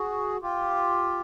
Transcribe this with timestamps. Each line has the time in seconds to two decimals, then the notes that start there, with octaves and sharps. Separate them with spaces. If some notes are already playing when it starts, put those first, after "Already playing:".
Already playing: F#4 G#4
0.42 F4 G4